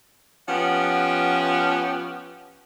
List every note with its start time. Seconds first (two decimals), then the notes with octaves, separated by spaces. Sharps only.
0.49 F3 B3 C#4 G4 B4 F#5